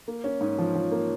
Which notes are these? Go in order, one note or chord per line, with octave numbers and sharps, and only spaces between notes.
A#3
C#4
G#2
F3
F3
A#3